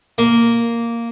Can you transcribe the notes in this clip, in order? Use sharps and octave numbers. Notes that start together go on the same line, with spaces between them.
A#3